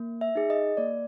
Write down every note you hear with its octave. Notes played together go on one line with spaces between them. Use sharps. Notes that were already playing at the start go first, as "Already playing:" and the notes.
Already playing: A#3
E5
D#4 G#4
D#5
A#3 D5